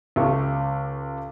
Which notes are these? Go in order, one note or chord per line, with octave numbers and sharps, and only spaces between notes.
C#2 G4 A4 C#6